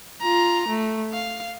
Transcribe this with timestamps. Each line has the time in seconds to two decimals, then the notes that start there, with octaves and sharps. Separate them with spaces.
0.21 F4 A#5
0.69 A3
1.12 F5